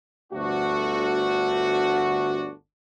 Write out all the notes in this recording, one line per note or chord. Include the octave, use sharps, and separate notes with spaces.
G1 D2 A3 D4 F#4